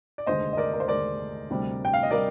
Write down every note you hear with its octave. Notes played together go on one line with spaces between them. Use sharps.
D5
F1 D#2 D3 G#3 C5 D#5
D#5
A#4 D5
A#4
C5
F1 D#2 D3 G#3 A#4 D5
D2 C3 G3
G5
F5
D#5
C3 G3 A#4 D5